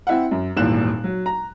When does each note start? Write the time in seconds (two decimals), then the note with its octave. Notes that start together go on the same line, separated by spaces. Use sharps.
0.07 C4 E4 F#5
0.31 F#2
0.57 D#1 G#1 E2 A#2 F#6 E7
1.04 F#3
1.26 A#5